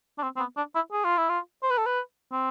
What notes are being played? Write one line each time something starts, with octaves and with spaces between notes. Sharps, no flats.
D4
C4
C4
B3
D4
E4
G#4
F4
E4
F4
C5
B4
A4
B4
C4